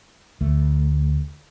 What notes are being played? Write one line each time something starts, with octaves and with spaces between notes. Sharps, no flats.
D2 A3